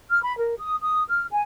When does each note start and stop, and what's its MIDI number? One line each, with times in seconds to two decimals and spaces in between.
0.10 0.21 89
0.23 0.35 83
0.39 0.54 70
0.59 0.75 87
0.82 1.03 87
1.09 1.24 89
1.32 1.43 80